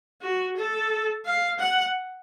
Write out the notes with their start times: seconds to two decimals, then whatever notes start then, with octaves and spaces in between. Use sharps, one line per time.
0.22 F#4
0.57 A4
1.25 F5
1.59 F#5